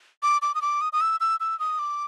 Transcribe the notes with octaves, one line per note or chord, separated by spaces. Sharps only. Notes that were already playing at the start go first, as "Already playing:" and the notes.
D6
D6
D#6
D6
D#6
D#6
E6
E6
E6
D#6
D6